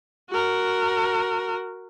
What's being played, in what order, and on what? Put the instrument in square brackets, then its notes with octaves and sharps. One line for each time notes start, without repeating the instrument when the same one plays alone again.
[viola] F#4 A#4